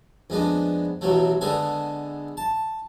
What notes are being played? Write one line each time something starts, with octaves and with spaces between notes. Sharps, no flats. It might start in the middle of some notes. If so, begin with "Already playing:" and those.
F2 G#3 B3 D4
A1 B2 F#3 A3
D3 G#3 B3 A4 G#5
A5